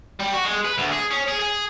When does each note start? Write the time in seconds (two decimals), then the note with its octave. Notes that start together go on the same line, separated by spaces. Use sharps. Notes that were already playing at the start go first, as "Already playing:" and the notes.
0.20 G3
0.33 F#4
0.45 G#3
0.65 B4
0.78 D2
0.92 G#4
1.11 C#4
1.28 G#4
1.39 G#4